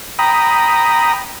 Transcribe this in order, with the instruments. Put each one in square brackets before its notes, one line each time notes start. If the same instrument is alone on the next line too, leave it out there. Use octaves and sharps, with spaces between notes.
[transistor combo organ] G5 A#5 B5 D#6